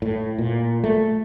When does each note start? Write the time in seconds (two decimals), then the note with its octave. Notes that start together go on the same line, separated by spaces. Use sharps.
0.02 A2
0.38 A#2
0.84 A3